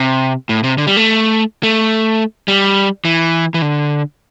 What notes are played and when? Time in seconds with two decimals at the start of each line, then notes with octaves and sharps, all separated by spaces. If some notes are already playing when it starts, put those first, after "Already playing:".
Already playing: C3
0.49 A2
0.64 C3
0.78 D3
0.87 G3
0.97 A3
1.63 A3
2.48 G3
3.05 E3
3.54 E3
3.62 D3